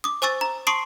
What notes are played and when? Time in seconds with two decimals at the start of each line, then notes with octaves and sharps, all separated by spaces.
0.04 D6 D#6
0.22 C5 G#5 C#6 E6 A6
0.41 A#5
0.67 A5 C6 C#6 D#6 C7 D7